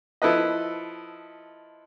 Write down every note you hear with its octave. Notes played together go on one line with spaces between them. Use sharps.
F3 E4 A4 B4 D#5